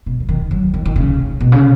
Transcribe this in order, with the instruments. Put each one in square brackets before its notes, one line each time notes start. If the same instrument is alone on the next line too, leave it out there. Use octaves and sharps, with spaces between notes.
[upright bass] B2
F#3
D#3
F#3
D#3
D#3
C#3
B2
C#3